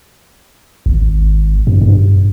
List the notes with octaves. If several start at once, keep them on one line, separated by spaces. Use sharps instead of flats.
G#1
G2
G2